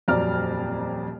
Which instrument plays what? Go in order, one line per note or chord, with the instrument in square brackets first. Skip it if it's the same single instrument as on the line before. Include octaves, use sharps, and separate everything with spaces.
[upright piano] D#1 F2 F#3 D5 A#5 F6